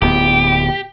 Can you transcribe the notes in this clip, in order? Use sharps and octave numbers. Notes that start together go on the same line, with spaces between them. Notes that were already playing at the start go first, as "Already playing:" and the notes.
D1 B3 G4